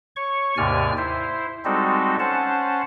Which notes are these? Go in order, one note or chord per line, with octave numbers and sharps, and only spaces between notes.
C#5 C#6
D#2 G#2 C3 D5 G#5 F6
E4 C5
G3 G#3 C4 D#4 F#4 A4
C#4 C5 F#5 A5